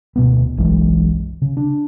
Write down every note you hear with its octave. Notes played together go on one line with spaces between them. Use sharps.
D1 B2 A3 B3
F#1 B1 E3 G#3
C#3
D4